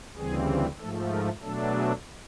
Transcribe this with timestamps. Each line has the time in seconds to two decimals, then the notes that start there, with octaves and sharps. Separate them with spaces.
0.16 D2 C#3 E3 G3 C4 G#4
0.79 G#2 F3 A3 A4
1.11 A#4
1.42 B2 F#3 A3 D4 A4
1.73 G#4